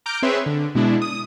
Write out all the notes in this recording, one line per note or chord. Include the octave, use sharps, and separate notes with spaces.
A#5 D6 F6 G6 D7
C4 G#4 B4 C#5 E5 C6
D3
B2 G#3 D4 E4
D#6